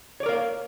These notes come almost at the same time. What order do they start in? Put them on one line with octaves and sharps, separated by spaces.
C#5 D5 A#4 F5